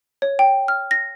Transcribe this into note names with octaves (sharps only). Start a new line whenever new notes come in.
C#5
G5
F6
A#6